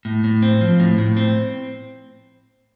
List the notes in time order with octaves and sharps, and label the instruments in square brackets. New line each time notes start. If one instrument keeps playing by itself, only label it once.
[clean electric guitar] A2
A2
C4
F3
A2
A2
C4